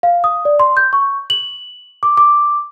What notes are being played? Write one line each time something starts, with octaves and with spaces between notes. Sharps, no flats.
F5
D#6
D5
C6
G6
C#6
F#7
D6
D6